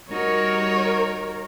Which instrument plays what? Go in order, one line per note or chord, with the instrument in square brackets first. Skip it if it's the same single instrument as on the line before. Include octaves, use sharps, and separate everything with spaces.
[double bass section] G3 [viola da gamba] D#4 F#4 [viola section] A#4 [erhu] C#5